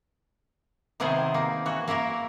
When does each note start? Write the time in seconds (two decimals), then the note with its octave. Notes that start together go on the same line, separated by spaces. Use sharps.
1.00 C3 D#3 B3 E4 G#4 C5
1.34 A#3
1.66 E3 F#4
1.88 A#3 E4 A#4 E5